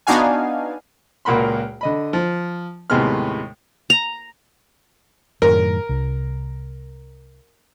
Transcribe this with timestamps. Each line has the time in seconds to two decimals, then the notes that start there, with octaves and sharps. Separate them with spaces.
0.07 B3 D4 D#4 F#4 F5 G#5
1.25 C#2 A#2 A#3 F#4 B5 C6
1.81 D3 D#5 B5
2.13 F3
2.90 D#2 A2 C3 G#3 B3 F6
3.90 A#5
5.42 F#2 A2 D#3 A#4
5.89 C2